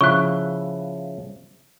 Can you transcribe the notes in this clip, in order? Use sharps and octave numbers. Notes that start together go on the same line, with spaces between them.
C#3 F3 E4 C#6 F#6